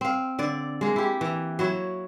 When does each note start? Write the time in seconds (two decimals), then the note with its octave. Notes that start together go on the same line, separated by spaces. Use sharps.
0.01 C4 F5
0.39 D3 D5
0.81 G#3 A#3
0.96 E4 G4
1.21 E3
1.59 F#3 E4 C#5